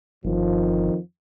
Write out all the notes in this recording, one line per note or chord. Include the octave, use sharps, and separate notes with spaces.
G1 F2 D#3 F3